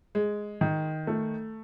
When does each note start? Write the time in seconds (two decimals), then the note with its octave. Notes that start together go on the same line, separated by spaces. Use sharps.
0.15 G#3
0.61 D#3
1.07 A3